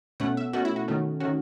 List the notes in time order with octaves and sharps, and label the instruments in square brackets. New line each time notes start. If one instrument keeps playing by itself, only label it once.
[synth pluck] B2 A3 C#4 F#5
E5
B2 A3 C#4 F#4
E4
F#4
D#3 A3 C#4
D#3 A3 C#4 F#4